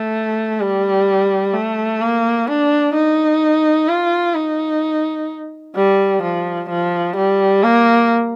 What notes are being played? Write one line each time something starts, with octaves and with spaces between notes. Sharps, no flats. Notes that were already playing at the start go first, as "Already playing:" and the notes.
Already playing: A3
G3
A3
A#3
D4
D#4
F4
D#4
G3
F3
F3
G3
A#3